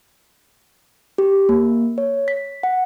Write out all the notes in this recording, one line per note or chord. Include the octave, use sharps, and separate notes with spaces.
G4
A#3
C#5
B6
F#5